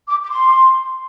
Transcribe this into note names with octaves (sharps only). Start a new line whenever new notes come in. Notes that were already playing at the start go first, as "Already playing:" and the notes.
D6
D6
C6